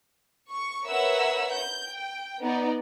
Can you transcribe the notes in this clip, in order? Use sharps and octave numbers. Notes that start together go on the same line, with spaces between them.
C#6
A#4 B4 C#5 E5 F#5 E6
G6
G5
B3 D#4 D5